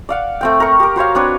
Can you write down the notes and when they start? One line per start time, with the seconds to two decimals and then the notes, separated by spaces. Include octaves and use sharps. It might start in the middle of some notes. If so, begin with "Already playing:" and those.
0.09 D5 F5 F#5
0.41 A3 C4 G5
0.60 A#4 C#6
0.80 G4 A#4
0.96 F#4 C5 C#5 F5
1.15 C4 D4 B4 C#5